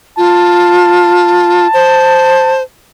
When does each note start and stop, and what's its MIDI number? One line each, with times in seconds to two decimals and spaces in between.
0.18 1.67 65
0.18 2.61 81
1.74 2.63 72